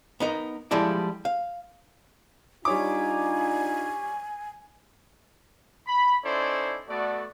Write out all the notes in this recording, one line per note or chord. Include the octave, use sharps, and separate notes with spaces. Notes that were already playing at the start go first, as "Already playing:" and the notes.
B3 D#4 A#4
F3 G3 G#3 E4 A4 D5
F5
G3 D4 D#4 F4 C#5 G#5 D6
B5
C#4 D#4 E4 A4 C5 D5
A3 B3 F#4 A4 D5